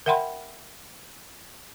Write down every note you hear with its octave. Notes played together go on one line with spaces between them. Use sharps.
A#4 E5 F#5 G5 B5 C6